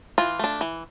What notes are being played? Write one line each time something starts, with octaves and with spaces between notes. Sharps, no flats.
E3 F4
A3 D4
E3